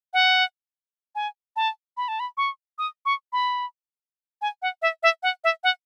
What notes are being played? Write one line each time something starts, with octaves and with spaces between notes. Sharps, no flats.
F#5
G#5
A5
B5
A5
B5
C#6
D#6
C#6
B5
G#5
F#5
E5
E5
F#5
E5
F#5